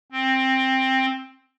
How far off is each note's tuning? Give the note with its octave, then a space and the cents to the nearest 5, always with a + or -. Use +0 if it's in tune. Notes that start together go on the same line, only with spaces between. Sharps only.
C4 +10